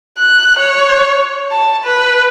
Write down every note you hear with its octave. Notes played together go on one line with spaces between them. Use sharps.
F#6
C#5
A5
B4